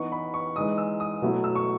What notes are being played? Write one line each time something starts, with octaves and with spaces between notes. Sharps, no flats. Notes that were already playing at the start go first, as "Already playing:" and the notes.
Already playing: E3 B3 D#4 C#6
B5
C#6
E3 G#3 D#4 D#6
E6
D#6
B2 F#3 A3 E4
E6
C#6